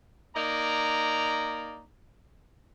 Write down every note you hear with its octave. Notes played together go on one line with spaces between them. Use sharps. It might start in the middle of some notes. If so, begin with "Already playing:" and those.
A#3 D#4 D5 A#5